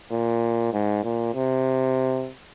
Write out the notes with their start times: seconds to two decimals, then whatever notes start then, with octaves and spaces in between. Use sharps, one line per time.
0.12 A#2
0.73 G#2
1.04 A#2
1.35 C3